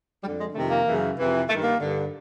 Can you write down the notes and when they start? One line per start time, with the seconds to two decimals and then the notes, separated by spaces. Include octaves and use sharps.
0.23 F2 G3
0.27 D3
0.39 G#3
0.54 F2 C3 D#3 A3
0.70 A#3
0.86 F#2 C#3 E3
1.17 F2 C3 E3
1.48 G2 D#3 A3
1.64 A#3
1.79 G2 D3